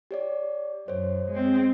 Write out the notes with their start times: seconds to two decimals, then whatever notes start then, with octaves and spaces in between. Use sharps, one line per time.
0.11 G4 C#5 D5
0.88 F#2 C5 C#5
1.31 G#3 C4